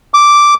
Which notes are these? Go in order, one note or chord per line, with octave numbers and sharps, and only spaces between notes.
D6